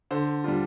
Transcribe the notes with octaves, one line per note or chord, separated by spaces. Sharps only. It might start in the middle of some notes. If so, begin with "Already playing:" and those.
D3 C5
G3 D4 F4